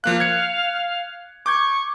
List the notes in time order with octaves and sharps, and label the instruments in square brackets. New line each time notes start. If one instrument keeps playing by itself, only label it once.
[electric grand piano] F3 A#3 F#6 [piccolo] F5
[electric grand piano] G#6 C#7
[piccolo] C#6 [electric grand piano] D6 G6 G#6